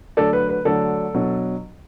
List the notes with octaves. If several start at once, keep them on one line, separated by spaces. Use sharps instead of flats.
D3 F#3 A3 D4 A4 D5
B4
B4
D3 F#3 A3 D4 A4 D5
B2 F#3 D4